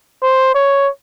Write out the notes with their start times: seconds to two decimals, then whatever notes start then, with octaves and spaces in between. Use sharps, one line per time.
0.23 C5
0.55 C#5